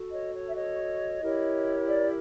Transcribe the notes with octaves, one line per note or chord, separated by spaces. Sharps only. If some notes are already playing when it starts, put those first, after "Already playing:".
Already playing: F#4 A4
C#5 D#5
C#5
E5
C#5 D#5
E4 G4 A#4 C#5
D5